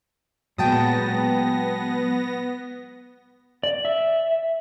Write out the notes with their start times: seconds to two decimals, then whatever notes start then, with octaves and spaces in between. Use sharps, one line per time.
0.58 A#2 F#3 G#3 B3 G5 A5 D#6 A#6
3.63 D5
3.85 E5